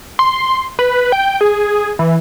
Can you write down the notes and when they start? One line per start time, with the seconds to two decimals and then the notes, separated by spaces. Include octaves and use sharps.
0.19 C6
0.79 B4
1.12 G5
1.41 G#4
1.99 E3